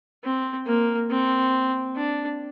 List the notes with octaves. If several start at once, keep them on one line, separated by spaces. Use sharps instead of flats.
C4
A#3
C4
D4